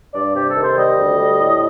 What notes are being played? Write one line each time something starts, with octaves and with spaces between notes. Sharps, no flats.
G2 D5
C3 G4
A4
D#3
C5
G3 D#5
D2
G3
A2